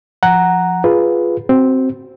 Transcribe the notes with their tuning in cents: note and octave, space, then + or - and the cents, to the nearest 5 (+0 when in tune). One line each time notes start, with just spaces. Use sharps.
F3 +0 F#5 +5 A#5 +0
F4 +0 G#4 +0 B4 +0
C4 +0 F#4 +25